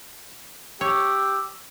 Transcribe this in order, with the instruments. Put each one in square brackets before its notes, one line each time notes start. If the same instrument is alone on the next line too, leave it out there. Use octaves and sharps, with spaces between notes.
[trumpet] G4 [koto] C#5 [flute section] D6 E6